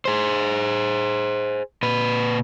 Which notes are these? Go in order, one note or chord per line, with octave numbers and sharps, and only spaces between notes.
G#4 C5
A#2 B4